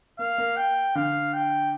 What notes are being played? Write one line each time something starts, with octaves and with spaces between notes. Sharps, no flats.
A#3 F5
A#3
G5
D3 F5
G5